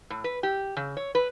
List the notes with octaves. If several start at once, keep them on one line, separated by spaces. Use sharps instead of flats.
A2
B4
G4
C#3
C#5
B4